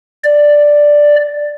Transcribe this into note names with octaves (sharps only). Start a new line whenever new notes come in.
D5